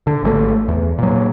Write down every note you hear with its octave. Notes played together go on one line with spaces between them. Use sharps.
D3
G#1 B2 A3
E2
A#2 F#3